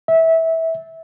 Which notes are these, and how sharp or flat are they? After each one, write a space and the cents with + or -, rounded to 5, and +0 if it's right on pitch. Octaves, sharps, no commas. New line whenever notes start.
E5 -20